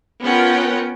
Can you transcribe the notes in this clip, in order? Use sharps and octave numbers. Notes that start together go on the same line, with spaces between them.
B3 C#4 F4 A#4 F#5 G5